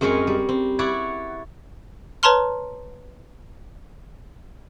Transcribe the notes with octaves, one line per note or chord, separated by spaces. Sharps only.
F#2 G#3 C4 A#4 C#5 G#5
G3
C4
E4 C#5 D5 F#5
B4 C#5 A5 A#5 C6 F6